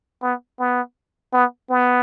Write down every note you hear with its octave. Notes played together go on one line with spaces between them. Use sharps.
B3
B3
B3
B3